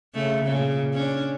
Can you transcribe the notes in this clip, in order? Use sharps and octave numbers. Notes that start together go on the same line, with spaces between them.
C#3 A3
A#2 C#3
C#4 D4